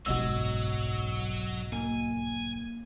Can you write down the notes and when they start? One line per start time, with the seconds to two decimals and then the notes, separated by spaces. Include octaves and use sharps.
0.06 F#1 B1 G#2 F#3 F#4 D#5 E6
1.72 A#3 G#5